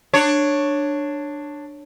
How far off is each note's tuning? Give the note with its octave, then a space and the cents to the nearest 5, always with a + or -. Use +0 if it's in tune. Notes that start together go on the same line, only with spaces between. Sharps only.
D4 +10 C#5 +0